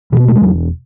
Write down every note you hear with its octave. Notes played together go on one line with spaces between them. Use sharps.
B2 E3
B3
A3
G#3
E1 F#3